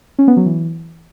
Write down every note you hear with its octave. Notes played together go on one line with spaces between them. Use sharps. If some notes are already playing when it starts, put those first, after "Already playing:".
C#4
B3
F#3
E3